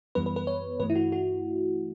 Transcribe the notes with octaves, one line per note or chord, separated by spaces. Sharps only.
F#2 E3 G3 B3 B4
B4
B4
C#5
G2 E3 A3 B4
E4
F#4
F#4